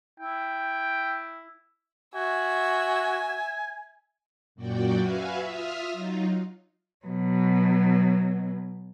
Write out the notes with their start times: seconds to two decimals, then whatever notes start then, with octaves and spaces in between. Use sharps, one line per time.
0.20 E4 G5
2.15 F#4 E5 G#5
4.55 F#2 A#2 F#4 D5 G5
4.98 F#4 B4 E5 F5 G#5
5.40 F4 E5 D#6 F6
5.92 F#3 D#4 F4
7.06 B2 F#3